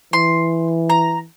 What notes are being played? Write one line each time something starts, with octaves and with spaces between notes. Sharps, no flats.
E3 C6
A#5